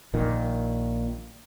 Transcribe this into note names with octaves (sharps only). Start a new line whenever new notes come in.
A#1 A#2 D#3